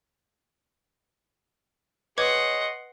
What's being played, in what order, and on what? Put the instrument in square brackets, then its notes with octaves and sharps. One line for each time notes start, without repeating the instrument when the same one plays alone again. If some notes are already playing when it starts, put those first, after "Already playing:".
[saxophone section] G#4 C#5 D#5 [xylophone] B4 D6 G#6 [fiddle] F#5 C6